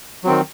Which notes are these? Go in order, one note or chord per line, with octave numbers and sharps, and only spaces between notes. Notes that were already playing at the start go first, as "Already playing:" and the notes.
D#3 F#3 C4